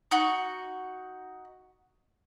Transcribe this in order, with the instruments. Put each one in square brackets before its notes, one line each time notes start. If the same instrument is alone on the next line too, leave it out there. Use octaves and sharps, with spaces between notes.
[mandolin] D#4 F#4